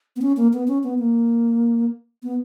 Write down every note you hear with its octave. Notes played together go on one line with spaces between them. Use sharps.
B3
C#4
A#3
B3
C#4
B3
A#3
B3